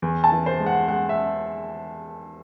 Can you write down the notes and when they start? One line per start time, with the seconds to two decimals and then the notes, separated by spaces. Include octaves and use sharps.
0.02 E2
0.24 A5
0.32 E3
0.46 C5
0.60 G#3
0.66 F#5
0.88 G#3 F#5
1.09 E5